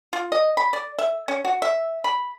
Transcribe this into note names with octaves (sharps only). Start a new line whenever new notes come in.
F4
D#5
B5
D5
E5
C#4
F#4
E5
B5